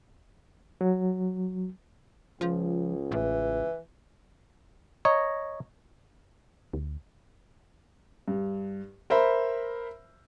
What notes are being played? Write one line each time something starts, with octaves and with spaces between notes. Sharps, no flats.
F#3
C#2 F3
A1 E3
C#5 D#5 A#5
D2
G2
A#4 C5 E5 B5